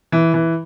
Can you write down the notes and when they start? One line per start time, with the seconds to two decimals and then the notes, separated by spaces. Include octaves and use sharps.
0.12 E3
0.34 E3